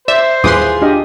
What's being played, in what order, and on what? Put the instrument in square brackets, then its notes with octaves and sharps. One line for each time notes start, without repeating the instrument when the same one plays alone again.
[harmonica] C5 [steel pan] D5 [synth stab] E5
[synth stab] D#2 E3 C6 [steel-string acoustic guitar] F4 G#4 [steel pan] B4 D6 D#6
[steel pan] D4 G4 D#5